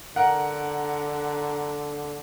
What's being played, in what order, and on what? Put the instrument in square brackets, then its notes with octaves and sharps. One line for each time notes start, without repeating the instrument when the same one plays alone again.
[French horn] D3 [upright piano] A#4 F#5